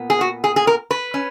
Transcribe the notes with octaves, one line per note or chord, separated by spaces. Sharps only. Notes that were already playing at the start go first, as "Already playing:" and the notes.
Already playing: A#2 B3
G#4
F#4
G#4
G#4
A#4
B4
C#4